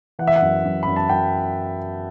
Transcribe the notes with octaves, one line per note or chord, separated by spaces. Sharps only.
E3 F#5
E5
F#5
F#2
F#2
F#2 B5
A5
F#2 G5